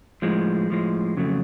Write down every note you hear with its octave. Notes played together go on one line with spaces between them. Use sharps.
A2 F3 G#3
A2 F3 G#3
F2 C#3 F#3 A3